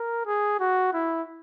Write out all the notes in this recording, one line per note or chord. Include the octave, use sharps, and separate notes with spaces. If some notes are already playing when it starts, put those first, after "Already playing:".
Already playing: A#4
G#4
F#4
E4